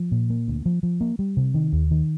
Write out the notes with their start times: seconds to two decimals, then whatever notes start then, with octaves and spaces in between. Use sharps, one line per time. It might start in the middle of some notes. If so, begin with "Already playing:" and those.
Already playing: F3
0.12 A#2
0.30 A#3
0.48 D2
0.66 F3
0.83 F3
1.01 A#3
1.19 G3
1.37 C3
1.54 D#3
1.73 D#2
1.91 D#3